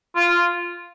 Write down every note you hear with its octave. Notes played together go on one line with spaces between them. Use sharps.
F4